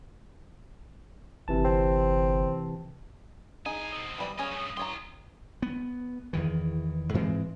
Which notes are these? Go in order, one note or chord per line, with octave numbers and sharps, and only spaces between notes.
G1 C3 E3 A5
C4
A2 D#4 G#4 G#5
B2 C4 D#6
E3 G3 E4
C#4 G#4 C#5 D#5 F5
G2 A3
E4 G4 C#5 A#5 C6
B3
E2 D#3 E3
G#2 E3 G#3 C4